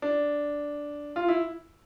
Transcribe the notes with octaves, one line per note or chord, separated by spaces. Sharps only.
D4
F4
E4